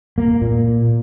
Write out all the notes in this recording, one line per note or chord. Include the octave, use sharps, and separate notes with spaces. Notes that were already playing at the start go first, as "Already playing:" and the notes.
A#3
A#2